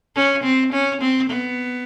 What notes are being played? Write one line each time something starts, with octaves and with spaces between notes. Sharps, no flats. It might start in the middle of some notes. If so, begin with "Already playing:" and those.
C#4
C4
C#4
C4
B3